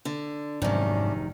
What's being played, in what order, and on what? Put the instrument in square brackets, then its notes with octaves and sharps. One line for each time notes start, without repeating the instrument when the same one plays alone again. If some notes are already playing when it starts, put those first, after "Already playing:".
[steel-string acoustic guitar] D3
[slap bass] F1 F#3 [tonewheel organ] G#2 [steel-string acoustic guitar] C3 D#3 [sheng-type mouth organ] C#4 D4